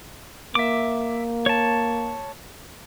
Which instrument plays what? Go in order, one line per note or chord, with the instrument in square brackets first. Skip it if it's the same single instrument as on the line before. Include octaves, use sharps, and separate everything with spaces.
[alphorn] A#3 [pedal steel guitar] E5 D6
[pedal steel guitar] C#5 A5